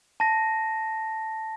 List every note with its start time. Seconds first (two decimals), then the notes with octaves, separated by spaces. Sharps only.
0.20 A5 A#6